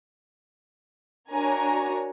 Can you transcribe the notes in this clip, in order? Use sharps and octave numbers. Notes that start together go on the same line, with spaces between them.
D4 F#4 A#4 C#5 G#5 A#5